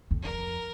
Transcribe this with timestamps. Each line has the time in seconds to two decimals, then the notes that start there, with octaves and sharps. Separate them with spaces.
0.11 F2
0.22 A#4